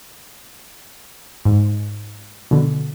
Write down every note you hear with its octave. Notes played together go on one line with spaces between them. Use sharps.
G#2
B2 D3